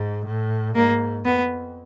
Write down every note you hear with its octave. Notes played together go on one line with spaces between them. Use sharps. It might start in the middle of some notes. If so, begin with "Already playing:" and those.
Already playing: G#2
A2
G#2 A#3
F2 B3